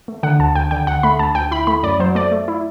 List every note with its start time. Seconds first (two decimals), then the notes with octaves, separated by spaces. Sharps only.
0.08 A3
0.23 D3 F#5
0.39 D2 A5
0.55 D2 G5
0.71 D3 G5
0.87 D2 F#5
1.03 A3 B5
1.19 D2 A5
1.35 D2 G5
1.51 E4 B5
1.67 A3 B5
1.83 F#2 D5
2.00 F#3 C5
2.15 A3 D5
2.32 A3
2.48 E4